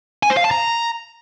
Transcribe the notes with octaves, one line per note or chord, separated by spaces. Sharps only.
G#5
C5
F5
A5
A#5